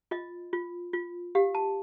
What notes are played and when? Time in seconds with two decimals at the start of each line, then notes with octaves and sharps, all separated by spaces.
0.11 F4 D#5
0.53 F4
0.93 F4
1.35 G4 F5
1.55 A5